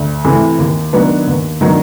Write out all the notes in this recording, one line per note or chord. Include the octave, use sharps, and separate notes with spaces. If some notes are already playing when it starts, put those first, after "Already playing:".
Already playing: D2
C3 E3 A3
D#2
D#3 F#3 B3 D4
D#2
D#3 F#3 B3 D4